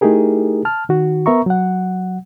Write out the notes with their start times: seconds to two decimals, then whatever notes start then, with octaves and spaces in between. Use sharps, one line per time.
0.01 A3 D#4 E4 G4 G#4 A#4
0.65 A5 F6
0.89 D#3 F#4
1.26 B3 A#4 E5 A#5 C#6
1.46 F#3 F#5